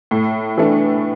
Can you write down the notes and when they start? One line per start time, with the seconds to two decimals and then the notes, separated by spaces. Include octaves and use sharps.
0.11 A2
0.58 E3 A3 D4